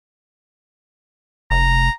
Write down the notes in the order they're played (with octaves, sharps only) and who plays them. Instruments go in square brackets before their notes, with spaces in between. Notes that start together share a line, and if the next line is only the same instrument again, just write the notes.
[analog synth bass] F1 [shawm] A#5